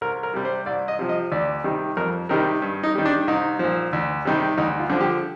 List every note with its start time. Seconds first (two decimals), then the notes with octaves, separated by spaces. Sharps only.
0.01 C2 A#4
0.23 A#4
0.34 C3 G3
0.45 C5
0.66 C2 D5
0.88 D#5
0.99 C3 F3
1.09 D#5
1.32 D2 D5
1.64 C3 D#3 G3
1.97 F2 A#4
2.29 C3 D#3 G3 A#4
2.62 G2
2.83 D#4
2.95 D#3 G3
3.05 D4
3.27 C2 D#4
3.59 A#2 F3
3.93 D2
4.25 C3 D#3 G3
4.57 D2 D#4
4.79 F4
4.90 D3 F3
5.01 G4